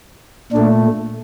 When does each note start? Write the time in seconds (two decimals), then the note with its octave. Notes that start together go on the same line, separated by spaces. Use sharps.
0.52 A#2 A3 D4